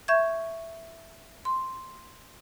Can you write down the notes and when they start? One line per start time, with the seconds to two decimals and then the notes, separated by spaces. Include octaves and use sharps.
0.08 E5 C#6 G6 G#6
1.45 C6